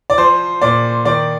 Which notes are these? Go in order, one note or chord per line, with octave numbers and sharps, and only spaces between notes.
D5
F3 C5
A#2 D5
D#3 D5